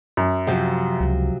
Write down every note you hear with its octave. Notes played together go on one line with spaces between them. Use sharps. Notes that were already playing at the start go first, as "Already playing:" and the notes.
F#2
C3 F3 F#3
C#2